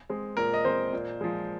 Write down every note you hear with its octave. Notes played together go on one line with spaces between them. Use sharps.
G#3 C4
A#2 A#4
D#5
G#3 C4 C5
A#2
F3 G#3